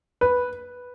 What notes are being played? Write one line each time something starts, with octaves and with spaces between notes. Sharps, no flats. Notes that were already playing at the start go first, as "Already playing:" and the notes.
B4